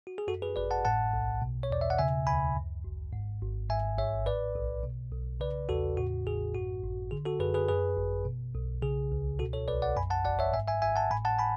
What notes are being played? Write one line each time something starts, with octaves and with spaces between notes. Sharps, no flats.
F#4
G#4
F#2 F#4 A4
G#4 B4
G#1 B4 D5
F#5 A5
A2 F#5 A5
B1
B2
C#5
E2 D5
E5
F#5
C#3 E5 G#5
D2 G#5 B5
F#2
G#1
G#2
G#1
G#2 E5 G#5
A1 C#5 E5
A2 B4 D5
B1
B2
B1
C#3 B4 D5
E2 F#4 A4
A2 F#4
A1 G#4
F#2 F#4
G#1
D3 G#4
F#4 A4
F#2 G#4 B4
G#4 B4
F#2 G#4 B4
G#1
B2
B1
C#3 G#4
C#2
B2 F#4 A4
A4 C#5
B1 B4 D5
D5 F#5
F#2 G#5 B5
F#5 A5
G#1 D5 F#5
C#5 E5
G#2 E5 G#5
E5 G#5
G#1 E5 G#5
F#5 A5
A2 G#5 B5
F#5 A5
G#5 B5